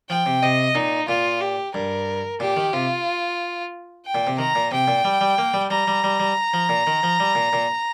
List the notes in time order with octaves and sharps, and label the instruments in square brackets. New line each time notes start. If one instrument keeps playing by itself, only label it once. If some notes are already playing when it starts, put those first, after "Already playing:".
[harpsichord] F3 [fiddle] G5
[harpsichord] C3
[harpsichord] C3 [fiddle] D#5
[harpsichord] A#2 [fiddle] D#4
[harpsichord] A#2 [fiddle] F4
[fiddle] G4
[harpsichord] G2 [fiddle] A#4
[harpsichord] A#2 [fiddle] G4
[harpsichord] D#3
[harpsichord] C3 [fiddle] F4
[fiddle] G5
[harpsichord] A#2
C3
[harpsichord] D#3 [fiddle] A#5
[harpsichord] A#2
[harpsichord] C3 [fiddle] G5
[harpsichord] A#2
G3
G3
A#3
G3
[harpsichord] G3 [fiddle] A#5
[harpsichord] G3
G3
G3
F3
A#2
D#3
F3
G3
A#2
A#2